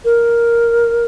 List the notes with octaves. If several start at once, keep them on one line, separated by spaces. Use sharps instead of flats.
A#4